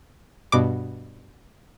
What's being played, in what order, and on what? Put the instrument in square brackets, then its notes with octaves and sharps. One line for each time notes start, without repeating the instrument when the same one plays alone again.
[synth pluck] G2 B2 D6